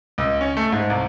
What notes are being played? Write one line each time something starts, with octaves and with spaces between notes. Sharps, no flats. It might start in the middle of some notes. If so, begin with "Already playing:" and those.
C#2
C#4
A3
G#2
C2